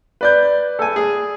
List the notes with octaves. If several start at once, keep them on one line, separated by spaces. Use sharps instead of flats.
B4 D5 G6
A4 G#5
G#4